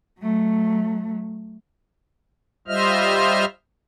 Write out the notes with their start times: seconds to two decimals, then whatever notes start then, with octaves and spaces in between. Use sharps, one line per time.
0.19 F#3 A3
2.68 G3 F4 C5 D#5 E5 F6